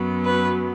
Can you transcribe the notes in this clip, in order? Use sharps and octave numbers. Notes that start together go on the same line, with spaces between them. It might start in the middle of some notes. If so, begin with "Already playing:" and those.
Already playing: F#2 F#3 B3
B4